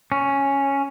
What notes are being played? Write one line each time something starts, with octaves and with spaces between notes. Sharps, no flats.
C#4